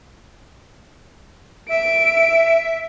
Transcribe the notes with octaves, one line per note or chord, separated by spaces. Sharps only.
E5 D7